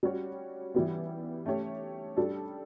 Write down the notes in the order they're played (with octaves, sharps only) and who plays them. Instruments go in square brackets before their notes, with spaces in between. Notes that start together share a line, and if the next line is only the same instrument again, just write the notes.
[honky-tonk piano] G3 C#4 F#4 C#5
E3 G3 B3
A3 C#4 G4 C#5
G3 D4 A4